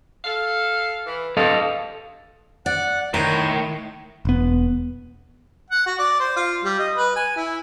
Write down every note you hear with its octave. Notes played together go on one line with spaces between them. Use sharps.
A4 F5
E3
G2 D3 A4 D#5 F5
D5 F#5
A2 D#3 A#4 C6
E1 B3
F#5
F#4
D5
C5
F4
G3
D#5
B4
G#5
E4